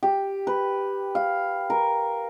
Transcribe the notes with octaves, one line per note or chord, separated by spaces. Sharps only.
G4
B4
F5
A#4